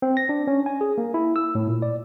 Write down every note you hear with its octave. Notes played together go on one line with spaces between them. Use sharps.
C4
A#6
D4
C#4
G#5
G#4
A#3
E4
E6
A2
A#2
D5